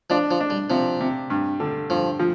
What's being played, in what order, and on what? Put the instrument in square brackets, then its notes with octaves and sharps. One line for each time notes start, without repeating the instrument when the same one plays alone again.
[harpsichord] F3 [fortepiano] D4
[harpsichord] F3
[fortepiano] D4
[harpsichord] G3
[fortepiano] C3 [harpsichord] F3
[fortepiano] C3
G2
D3
[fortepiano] G2 [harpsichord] F3
[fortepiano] F3